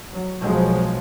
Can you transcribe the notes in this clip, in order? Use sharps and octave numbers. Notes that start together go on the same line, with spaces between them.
F#3
B1 B2 F3 F#3 G#3